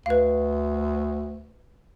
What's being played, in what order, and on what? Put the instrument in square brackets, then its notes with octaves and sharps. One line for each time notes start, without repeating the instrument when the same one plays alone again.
[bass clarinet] D2 [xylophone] B4 F5